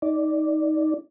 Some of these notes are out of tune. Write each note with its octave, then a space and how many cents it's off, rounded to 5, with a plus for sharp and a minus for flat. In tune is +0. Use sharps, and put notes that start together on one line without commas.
D#4 +15 D5 +0